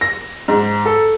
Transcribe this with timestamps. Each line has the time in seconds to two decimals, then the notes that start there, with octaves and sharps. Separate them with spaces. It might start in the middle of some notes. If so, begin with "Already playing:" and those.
0.01 A#6
0.48 G#2
0.85 A4